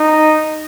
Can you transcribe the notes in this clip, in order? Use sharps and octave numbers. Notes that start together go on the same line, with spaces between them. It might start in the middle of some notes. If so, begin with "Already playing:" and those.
Already playing: D#4